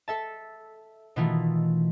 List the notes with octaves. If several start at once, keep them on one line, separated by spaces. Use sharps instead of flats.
A4 E5 A5
B2 D#3 E3 A3 E4 F4